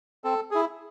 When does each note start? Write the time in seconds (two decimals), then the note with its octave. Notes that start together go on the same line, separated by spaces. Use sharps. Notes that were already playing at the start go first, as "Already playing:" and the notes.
0.24 C4 A4
0.51 E4 G#4